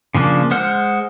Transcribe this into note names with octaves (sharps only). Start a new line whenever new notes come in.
C#3 F3 A#3 D4
G#3 C5 F#5 F6